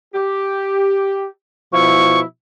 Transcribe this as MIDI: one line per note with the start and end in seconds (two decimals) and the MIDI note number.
0.15 1.26 67
1.73 2.21 47
1.73 2.21 53
1.73 2.21 64
1.73 2.20 85